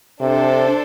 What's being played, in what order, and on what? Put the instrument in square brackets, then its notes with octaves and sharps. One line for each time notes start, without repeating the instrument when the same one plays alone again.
[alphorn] C3 [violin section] D4 A4 C5